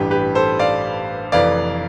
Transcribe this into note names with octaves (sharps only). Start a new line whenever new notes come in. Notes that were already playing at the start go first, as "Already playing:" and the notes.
Already playing: A1 G2 E3 G4 B4
G4 B4
A4 C5
D5 F5
F1 F2 E3 D5 F5